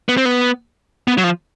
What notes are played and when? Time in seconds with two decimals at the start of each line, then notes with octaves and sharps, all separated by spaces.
0.09 B3
0.17 C4
0.25 B3
1.08 B3
1.18 F#3
1.24 F3